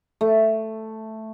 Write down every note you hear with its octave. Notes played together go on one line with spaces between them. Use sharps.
A3